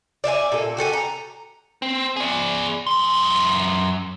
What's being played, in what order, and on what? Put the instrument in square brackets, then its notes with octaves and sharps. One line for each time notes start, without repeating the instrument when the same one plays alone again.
[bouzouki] D5 E5 F5 G#5
A#2 A4
F#4 G4 A4 G#5
A#5
[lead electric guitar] C4
G#4 D5
F#2 C6